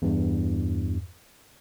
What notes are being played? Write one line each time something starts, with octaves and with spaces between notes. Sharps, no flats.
E2 G2